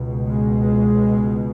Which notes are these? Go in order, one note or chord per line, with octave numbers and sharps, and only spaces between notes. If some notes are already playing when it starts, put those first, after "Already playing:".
Already playing: C#2 B2
G#3